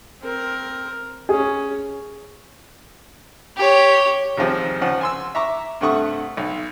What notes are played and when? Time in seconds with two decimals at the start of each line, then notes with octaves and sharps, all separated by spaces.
0.21 C4 A#4
1.29 C#4 G#4
3.56 G4 C#5
4.37 D#2 G#2 C3 F3 G3
4.81 C#2 F3 F#5
5.01 G#5 C6 E6
5.35 E5 A#5 C#6 D6
5.81 G2 C3 A3 F#5 C#6 D#6
6.37 B1